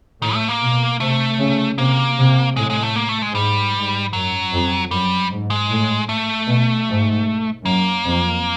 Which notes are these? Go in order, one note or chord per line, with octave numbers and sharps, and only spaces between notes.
A2 D#3
A3
A#3
B2
C3 A3
C#3
C3 A#3
C3
A2 G#3
G#3
A3
A#3
A3
G#3
G#2 G3
G#2
F#2 F#3
F2
F#2 G3
G#2
G#3
A2
A3
B2
G#2
F#2 A#3
F2